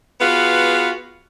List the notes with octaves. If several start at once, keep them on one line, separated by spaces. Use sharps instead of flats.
B3 F4 F#4 G#4 B4